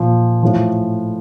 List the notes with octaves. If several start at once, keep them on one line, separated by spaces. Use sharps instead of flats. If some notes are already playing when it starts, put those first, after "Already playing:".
Already playing: A#2 F3
A2 F3